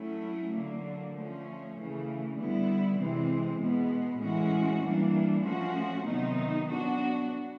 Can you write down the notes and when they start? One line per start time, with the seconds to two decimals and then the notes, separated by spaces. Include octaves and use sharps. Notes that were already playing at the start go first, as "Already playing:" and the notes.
Already playing: F#3 A3 C#4 E4
0.55 D3 F#3 A#3
1.16 F3 A3 C#4
1.77 C#3 E3 A3
2.39 D3 G3 B3 E4
2.99 C3 E3 G#3 C4
3.61 B2 G#3 B3
4.22 A2 E3 G#3 C#4 F#4
4.83 E3 G3 A#3 D4
5.44 F3 A3 C#4 F#4
6.06 C3 D#3 F#3 B3 D#4
6.67 F#3 B3 D4 F#4